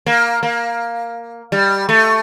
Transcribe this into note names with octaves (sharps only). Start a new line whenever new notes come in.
A#3
A#3
G3
A3